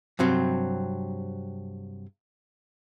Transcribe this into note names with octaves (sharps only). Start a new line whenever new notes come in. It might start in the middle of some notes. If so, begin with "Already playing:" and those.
G2 C3 F#3 C4